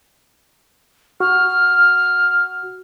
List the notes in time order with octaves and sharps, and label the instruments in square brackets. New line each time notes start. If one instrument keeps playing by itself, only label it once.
[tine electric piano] F#4 [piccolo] F6